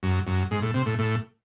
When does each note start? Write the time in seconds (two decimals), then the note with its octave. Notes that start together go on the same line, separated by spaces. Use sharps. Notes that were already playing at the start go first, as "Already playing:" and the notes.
0.03 F#2
0.27 F#2
0.51 G#2
0.63 A2
0.74 C3
0.86 A2
0.99 A2